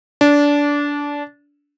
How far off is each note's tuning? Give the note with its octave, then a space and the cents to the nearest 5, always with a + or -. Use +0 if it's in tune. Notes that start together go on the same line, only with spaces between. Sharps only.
D4 -20